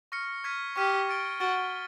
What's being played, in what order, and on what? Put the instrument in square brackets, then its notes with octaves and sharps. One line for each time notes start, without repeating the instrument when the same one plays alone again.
[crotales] C#6 F6 A#6 C#7
C#6 F6 G#6 B6 D#7
[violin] G4 [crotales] C#6 F6 G#6 B6 D#7
[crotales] C#6 F6 A6 D7 G7
[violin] F#4 [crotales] C#6 F6 A6 D7 G7